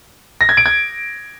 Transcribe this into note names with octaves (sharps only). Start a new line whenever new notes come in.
A#6
G#6
D7
G#6